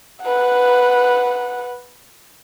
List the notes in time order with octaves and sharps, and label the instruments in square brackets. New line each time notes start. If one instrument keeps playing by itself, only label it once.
[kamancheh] B4 F#5